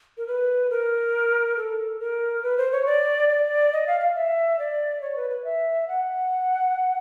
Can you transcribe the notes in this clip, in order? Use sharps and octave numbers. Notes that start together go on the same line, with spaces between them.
A#4
B4
A#4
A4
A#4
B4
C5
C#5
D5
D5
D#5
F5
F5
E5
D5
C#5
B4
B4
E5
F#5